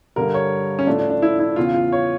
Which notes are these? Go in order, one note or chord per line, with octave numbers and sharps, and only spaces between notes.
G2 D3 G3 A#4
C#5
C#4
A2 F3 A3 D4
D4
D4
E4
E4
E2 C#3 E3 F4
F4
C#5